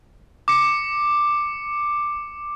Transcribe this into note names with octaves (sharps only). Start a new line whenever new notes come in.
D6 C#7